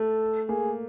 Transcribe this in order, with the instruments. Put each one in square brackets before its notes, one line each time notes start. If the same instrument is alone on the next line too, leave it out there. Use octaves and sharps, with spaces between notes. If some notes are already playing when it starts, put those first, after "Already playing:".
Already playing: [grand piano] A3 [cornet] A4
[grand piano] A#3 [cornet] G#4